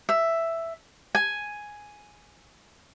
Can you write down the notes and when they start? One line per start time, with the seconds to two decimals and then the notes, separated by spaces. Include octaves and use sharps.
0.09 E5
1.15 G#5